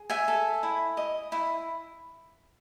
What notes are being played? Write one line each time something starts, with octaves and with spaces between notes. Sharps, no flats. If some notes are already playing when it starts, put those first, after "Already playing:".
Already playing: G#4
E5 G#5
A4
E4
D#5
E4